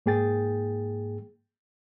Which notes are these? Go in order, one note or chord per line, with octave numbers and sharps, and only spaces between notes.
G#2 A#3 G#4 G5 A6